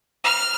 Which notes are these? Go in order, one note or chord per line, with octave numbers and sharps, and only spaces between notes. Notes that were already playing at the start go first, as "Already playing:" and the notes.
F6